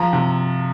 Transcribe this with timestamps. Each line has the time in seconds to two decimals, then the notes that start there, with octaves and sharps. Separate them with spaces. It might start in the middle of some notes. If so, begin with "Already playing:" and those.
Already playing: F3 A#5
0.13 C3